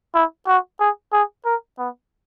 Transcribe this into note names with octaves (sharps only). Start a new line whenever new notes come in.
E4
F#4
G#4
G#4
A#4
B3